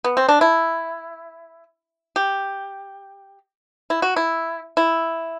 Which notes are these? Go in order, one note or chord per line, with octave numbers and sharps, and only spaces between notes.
B3
C4
D4
E4
G4
E4
F#4
E4
E4